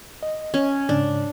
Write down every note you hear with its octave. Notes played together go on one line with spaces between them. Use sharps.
D#5
C#4
G#2 C#3 D4